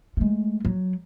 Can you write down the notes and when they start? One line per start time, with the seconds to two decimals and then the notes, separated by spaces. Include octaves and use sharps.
0.17 G#3 A3
0.65 F#3